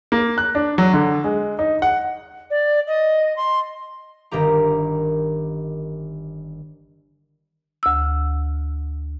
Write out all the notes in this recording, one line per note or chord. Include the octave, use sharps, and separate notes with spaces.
A#3
F#6
D4
F#3
D3
G#3
D#4
F#5
D5
D#5
C6
G1 D#3 A#3 G4 A#5
D2 E6